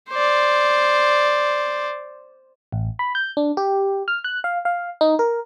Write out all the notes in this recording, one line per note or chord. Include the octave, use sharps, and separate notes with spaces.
C5 D5
A1
B5
G6
D4
G4
F6
F#6
F5
F5
D#4
A#4